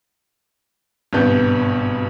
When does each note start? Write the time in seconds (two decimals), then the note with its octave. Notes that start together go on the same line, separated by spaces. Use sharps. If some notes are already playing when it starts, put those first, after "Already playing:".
1.13 G#1 G2 B2 B3 G6